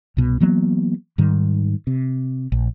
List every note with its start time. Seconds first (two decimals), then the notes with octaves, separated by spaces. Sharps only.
0.17 C2 B2
0.40 E3 F#3 A#3 B3
1.18 G#2 D#3 G3
1.87 C3
2.52 A#1